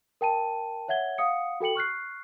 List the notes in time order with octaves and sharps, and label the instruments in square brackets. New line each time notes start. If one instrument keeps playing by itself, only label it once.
[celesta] A#4 G5 A5 D#7
C#5 E5 F#5 G#6 G7
F5 F#5 D#6 C#7
F#4 A4 G5 C#7 F#7
C#6 F6 F#6 C7